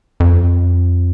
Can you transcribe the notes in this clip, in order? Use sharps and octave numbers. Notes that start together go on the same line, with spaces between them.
F2